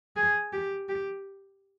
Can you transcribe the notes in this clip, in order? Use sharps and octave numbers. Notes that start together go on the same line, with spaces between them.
G#4
G4
G4